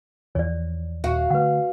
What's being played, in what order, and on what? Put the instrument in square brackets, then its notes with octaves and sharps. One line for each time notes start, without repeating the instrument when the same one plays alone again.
[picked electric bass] E2 E3 F3 [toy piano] C#5 D5
[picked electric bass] D#1 [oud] F#4 [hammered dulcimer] F5
[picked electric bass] D3 A3 [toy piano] B4 F#5